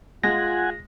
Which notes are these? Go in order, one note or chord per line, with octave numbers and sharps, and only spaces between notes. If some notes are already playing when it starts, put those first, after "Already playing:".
G#3 F4 F#5 G#5 A#6